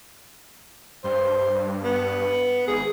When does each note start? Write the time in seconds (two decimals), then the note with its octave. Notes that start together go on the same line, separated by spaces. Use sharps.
1.04 G2 C5
1.84 B3
2.68 G#1 G#4